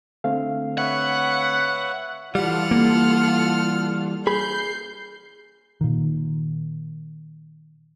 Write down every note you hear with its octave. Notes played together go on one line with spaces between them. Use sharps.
D3 A3 C4 F5
B4 C#5 E5 F#5
E3 G3 F4 A4 F#5 F6
A#3
G#4 B5 G6 C7
A#2 D#3